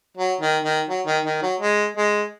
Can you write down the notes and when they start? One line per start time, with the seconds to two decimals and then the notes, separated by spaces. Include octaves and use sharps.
0.17 F#3
0.41 D#3
0.65 D#3
0.89 F#3
1.07 D#3
1.25 D#3
1.43 F#3
1.60 G#3
1.97 G#3